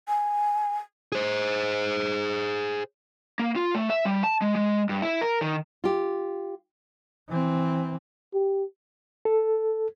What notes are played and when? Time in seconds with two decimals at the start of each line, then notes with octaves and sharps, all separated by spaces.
0.08 G#5
1.12 G#4 C5
3.39 A#3
3.56 F4
3.75 A3
3.90 E5
4.05 G3
4.24 A5
4.42 G#3
4.55 G#3
4.89 G2
5.02 E4
5.21 A#4
5.42 D#3
5.84 F4 G4
7.29 E3 C4
8.34 G4
9.25 A4